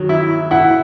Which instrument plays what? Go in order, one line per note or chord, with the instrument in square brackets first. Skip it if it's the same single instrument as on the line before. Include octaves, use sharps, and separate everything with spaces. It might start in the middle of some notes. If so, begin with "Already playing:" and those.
Already playing: [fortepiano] D#3 F#3
E4
[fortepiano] E4 [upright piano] F#5